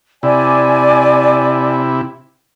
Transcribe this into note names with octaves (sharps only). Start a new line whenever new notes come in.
C3 E4 D5 G#5